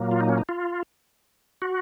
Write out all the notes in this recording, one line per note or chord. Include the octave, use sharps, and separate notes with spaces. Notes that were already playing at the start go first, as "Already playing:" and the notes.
Already playing: A#2 F#3 A#3
F4
D#4
C#4
D#4
F4
F#4